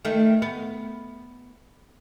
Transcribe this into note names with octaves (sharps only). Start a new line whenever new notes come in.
D#3 A3
B3